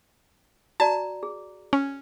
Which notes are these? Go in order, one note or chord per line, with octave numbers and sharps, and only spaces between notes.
F#4 D5 A5 A#5
G#4
C#4